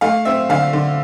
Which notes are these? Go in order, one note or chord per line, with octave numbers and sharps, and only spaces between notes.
A3 F5
C4 E5
D3 F5
D3